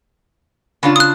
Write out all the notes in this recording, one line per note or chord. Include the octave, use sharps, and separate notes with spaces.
C#3 D4 F4
D#6 F#6